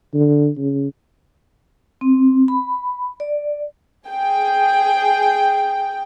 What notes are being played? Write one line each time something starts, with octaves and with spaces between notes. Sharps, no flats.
D3
C#3
C4
B5
D5
G#4 G5